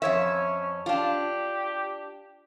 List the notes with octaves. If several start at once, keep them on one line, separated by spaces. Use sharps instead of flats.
F2 C#4 C#5 E5
D4 F4 G4